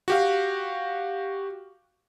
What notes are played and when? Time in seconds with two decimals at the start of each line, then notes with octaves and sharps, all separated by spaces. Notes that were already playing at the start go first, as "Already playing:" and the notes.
0.08 F#4 G4 F5